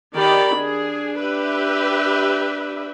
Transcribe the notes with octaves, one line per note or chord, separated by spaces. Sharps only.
D#3 G4 D5 B5
D4 G#4
G4 B4 E5